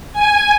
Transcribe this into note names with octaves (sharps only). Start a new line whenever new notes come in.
G#5